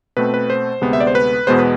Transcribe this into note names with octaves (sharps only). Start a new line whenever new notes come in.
B2 A3 C4 B4
B4
C5
D2 C3 G#3 B3
E5
D5
C5
B4
E2 B2 G#3 B3 C5
B4